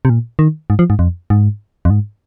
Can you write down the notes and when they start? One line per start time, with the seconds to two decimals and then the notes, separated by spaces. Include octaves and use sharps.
0.05 C3
0.10 A#2
0.39 D#3
0.70 G#2
0.79 F3
0.90 G#2
0.99 F2
1.30 G#2
1.85 F2
1.90 G#2